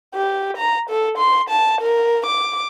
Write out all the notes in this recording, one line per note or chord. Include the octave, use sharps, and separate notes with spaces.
G4
A#5
A4
C6
A5
A#4
D6